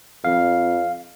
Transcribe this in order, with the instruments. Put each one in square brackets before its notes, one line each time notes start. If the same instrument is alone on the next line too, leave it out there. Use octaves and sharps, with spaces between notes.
[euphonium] F2 [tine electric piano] F5